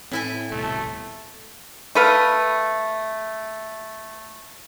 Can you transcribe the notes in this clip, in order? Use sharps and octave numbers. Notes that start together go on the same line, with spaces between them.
A2 C4 E4 G#5
D#1 C2 B2 A3
A3 B4 F5